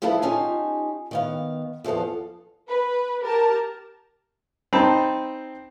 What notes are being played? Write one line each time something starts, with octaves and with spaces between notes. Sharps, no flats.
F3 B3 E4 A4 F5 A5
C#4 D#4 F4 G4 G#5 A5
D#3 B3 F5
E2 F3 B3 A4 F5
B4
G4 A#4 A5
C4 D#4 G5 A5 B5